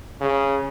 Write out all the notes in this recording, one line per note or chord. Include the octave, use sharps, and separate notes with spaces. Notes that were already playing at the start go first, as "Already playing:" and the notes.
C#3